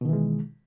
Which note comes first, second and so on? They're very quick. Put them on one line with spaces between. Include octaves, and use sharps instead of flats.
B2 D#3 E3 G#3